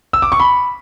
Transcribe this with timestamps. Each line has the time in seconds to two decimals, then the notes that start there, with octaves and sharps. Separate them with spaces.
0.13 E6
0.22 D6
0.32 C#6
0.40 B5